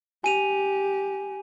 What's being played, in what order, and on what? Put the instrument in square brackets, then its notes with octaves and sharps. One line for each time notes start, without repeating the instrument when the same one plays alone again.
[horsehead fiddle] G4 [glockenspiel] G#5 D#7 F7